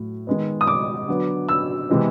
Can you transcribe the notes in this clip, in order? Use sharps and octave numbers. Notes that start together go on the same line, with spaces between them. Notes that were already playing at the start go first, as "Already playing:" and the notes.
Already playing: A2 F#3 A3
D#3 G#3 B3
D#6
D6
D3 F#3 B3
E6
C3 E3 G#3 B3